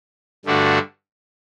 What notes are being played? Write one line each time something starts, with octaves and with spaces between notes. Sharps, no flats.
G2 D3 A3 D4 F#4